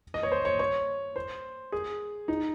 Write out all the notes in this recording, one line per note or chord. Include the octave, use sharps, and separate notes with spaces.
D#5
C#5
C5
C#5
C#5
C5
G#4
D#4